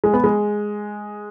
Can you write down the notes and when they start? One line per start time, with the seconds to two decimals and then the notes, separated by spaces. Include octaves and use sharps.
0.04 G#3
0.14 B3
0.24 G#3